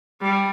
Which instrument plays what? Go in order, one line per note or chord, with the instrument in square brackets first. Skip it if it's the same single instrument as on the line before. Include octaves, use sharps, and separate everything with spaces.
[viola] G3